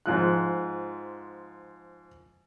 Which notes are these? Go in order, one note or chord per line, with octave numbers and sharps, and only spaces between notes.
G#2 F3 F#6